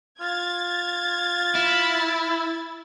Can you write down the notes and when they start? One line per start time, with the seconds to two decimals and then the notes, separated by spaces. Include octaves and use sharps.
0.21 F4 G#6 A6
1.55 E4